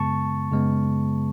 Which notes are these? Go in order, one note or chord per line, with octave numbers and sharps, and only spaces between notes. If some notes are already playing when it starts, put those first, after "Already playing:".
Already playing: F#2 C#3 G#3 B3 A5 C#6
F#2 C#3 G#3 B3